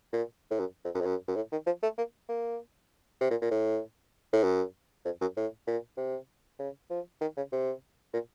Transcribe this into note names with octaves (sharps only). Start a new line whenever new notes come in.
A#2
A2
F#2
F2
F#2
F2
F#2
F#2
A2
D#3
F3
A3
A#3
A#3
C3
A#2
A#2
A2
A2
F#2
F2
F#2
A2
A#2
C3
C#3
F3
D#3
C#3
C3
A#2